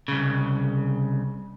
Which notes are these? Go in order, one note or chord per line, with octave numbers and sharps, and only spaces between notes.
C2 C#3